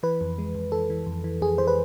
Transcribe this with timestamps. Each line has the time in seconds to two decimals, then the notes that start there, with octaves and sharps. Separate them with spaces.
0.03 E3 B4
0.21 F2
0.38 G#3
0.55 F2
0.72 E3 A4
0.90 E3
1.06 F2
1.24 E3
1.42 F2 G#4
1.58 E3 C5
1.68 B4